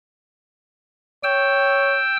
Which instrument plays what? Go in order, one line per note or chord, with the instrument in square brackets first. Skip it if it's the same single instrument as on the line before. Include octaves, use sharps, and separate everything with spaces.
[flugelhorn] C#5 [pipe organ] G5 E6